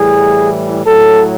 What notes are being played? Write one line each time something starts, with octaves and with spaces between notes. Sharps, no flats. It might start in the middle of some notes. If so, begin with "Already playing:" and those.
Already playing: A2 E3 G3 G#4
A2 F#3 A4